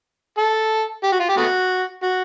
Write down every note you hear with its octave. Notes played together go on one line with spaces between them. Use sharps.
A4
G4
F#4
F4
G4
A3 B3 F#4
F#4